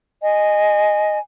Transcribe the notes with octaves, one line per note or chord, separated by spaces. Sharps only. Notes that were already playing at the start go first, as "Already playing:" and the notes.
D#5 G#5